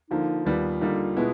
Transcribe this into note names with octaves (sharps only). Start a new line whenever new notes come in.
D3 F3 A#3 D#4
D#2 D#3 G3 B3 F4
D3 G3 A#3 D#4
B2 G#3 B3 E4